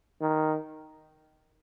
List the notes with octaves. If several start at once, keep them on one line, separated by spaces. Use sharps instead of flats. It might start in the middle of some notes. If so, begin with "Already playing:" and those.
D#3